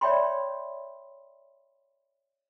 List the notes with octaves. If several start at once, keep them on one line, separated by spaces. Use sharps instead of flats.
C#5 D5 E5 G5 B5 C6